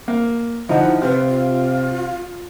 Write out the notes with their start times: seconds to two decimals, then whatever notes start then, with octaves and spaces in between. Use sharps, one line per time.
0.08 A#3
0.69 D3 F3 D#4 E4 F#5
1.02 C3 C4 B4 F5
1.29 F4